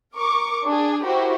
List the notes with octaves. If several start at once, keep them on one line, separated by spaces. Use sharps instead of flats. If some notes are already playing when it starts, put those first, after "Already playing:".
A#4 C#6 D6
D4 G#4
E4 F#4 G4 A#4 C5